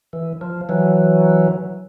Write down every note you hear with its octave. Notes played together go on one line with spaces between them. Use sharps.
E3
F3
E3 F#3